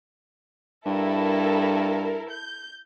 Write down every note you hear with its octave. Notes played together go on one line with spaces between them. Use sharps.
G2 E4 A4 A#4
G6